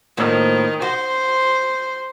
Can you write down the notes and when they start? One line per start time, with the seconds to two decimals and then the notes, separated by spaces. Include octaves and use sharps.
0.17 A2 D#3 F3 A#3
0.82 F#4 C5